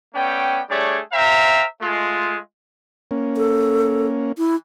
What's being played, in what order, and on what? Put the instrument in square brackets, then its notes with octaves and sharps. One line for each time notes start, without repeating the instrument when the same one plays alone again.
[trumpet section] A3 B3 C#4 D5 G5
G3 A3 D4 G#4 C#5 D5
C5 E5 F5 G5 A#5
G#3 A3 F4
[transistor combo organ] A#3 C#4
[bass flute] A4
E4